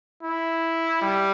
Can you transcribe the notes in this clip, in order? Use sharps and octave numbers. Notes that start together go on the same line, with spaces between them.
E4
G3